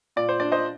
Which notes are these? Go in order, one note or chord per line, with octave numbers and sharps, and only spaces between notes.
A#2 D5
C5
D4 D5
C5 D#5